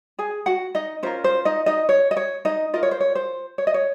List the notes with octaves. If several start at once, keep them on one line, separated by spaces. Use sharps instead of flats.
G#4 G#5
F#4 F#5
D#4 D#5
C#4 F4 A#4 C5
C5
D#4 D#5
D#4 D#5
C#5
D#5
C#5
D#4 D#5
F4 A#4 D#5
C#5
C5
C#5
C5
C#5
D#5
C#5